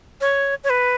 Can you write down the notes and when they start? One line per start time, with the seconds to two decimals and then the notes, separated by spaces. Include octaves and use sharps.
0.21 C#5
0.64 C#5
0.70 B4